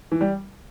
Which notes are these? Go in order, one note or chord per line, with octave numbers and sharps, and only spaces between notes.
E3
G3